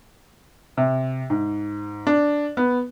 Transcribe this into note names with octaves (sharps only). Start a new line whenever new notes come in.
C3
G#2
D4
B3